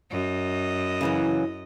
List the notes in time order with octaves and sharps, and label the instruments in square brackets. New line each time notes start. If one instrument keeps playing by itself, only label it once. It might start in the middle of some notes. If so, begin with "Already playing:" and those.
[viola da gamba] F#2 D#5
[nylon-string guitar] C#3 E3 F#3